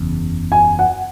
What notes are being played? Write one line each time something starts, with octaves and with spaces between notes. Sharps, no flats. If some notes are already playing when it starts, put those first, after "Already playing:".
Already playing: F#1 E2 C#3
G#5
F#5